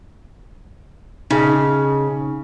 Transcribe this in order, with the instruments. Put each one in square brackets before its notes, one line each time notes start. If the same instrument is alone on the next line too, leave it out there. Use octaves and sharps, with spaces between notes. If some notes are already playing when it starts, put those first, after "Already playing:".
[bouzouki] C#3 [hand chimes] D#4 G#4